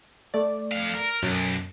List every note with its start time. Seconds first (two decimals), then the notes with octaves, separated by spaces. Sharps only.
0.34 A3 D5
0.72 F2 F5
0.95 A#4
1.22 B1 F#2